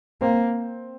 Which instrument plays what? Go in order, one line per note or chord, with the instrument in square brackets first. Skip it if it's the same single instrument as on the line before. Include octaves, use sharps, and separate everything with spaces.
[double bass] A#3 [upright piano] C4